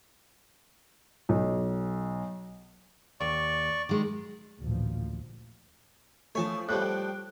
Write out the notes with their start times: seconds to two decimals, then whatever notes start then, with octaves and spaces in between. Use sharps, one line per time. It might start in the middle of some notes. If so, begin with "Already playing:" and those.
1.29 B1
3.20 D#2 D5 C#6
3.89 D#3 G#3
4.62 A1 D2 A#2 F3
6.35 F3 A3 C#5 G#5 A5
6.69 A2 F3 G3 F#6
6.82 G5